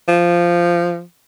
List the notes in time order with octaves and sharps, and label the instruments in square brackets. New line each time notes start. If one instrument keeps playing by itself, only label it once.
[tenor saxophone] F3